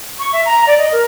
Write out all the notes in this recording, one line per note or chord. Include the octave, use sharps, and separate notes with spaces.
C#6
E5
A#5
D5
D#5
A#4